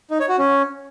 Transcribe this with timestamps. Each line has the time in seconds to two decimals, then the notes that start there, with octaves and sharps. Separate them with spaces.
0.11 D#4
0.20 C#5
0.29 F#4
0.38 C#4